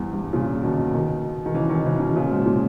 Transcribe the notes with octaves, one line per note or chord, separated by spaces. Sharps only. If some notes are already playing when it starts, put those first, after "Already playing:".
Already playing: E2 G2
G2
A#2 C#3
B2 D#3
B2 D#3
D#3
C#3 E3
B2 D#3
C#3 E3
B2 D#3
A#2 C#3
G#2 B2
A#2